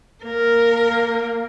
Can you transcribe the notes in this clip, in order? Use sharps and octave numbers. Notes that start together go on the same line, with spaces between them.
A#3 A#4